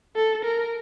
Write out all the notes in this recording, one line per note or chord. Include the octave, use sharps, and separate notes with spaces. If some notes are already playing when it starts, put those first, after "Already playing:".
A4
A#4